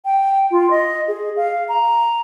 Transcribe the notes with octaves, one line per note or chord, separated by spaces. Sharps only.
G5
F4
D#5
G#4
F5
A#5